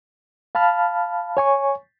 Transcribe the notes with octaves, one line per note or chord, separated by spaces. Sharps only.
F5 A5 B5 F6
C#5 G#5 C#6